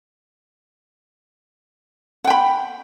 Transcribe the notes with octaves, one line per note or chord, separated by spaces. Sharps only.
F#5 G5 B5